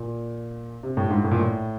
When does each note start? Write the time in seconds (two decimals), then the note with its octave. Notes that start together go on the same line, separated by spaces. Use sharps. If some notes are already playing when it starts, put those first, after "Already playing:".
Already playing: A#2
0.83 C3
0.97 A2
1.11 G#2
1.24 A2
1.31 A#2
1.39 A2